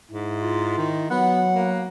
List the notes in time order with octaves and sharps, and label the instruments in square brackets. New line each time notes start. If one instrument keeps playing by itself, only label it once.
[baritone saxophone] G#2 [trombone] E4
[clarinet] F4
[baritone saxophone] D#3
[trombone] F#3 [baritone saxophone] B3 [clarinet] F#5
[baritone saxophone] A#3